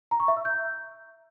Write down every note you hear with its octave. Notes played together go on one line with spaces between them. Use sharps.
A#5
C#6
E5
E6
G6